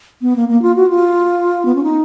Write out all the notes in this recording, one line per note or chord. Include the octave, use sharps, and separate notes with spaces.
B3
A#3
A#3
F4
F#4
F4
B3
C#4
D#4